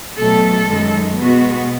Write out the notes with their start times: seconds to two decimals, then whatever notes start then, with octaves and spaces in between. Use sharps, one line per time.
0.18 B2 F#3 A3 A4
0.68 F#2 D#3 G#3
1.19 B2 G#3 B3 F#4